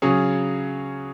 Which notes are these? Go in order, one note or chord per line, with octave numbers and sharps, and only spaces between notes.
C#3 F#3 C#4 G#4